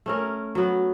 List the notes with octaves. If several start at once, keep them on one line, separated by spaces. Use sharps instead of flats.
A3 C#4 A#4
F#3 B3